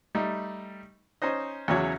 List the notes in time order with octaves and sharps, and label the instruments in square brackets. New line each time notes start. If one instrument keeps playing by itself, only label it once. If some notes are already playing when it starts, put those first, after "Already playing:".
[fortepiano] G3 A3 D#4
C#4 D#4 C5 D#5
E2 C#3 E3 F#3 E4 C#5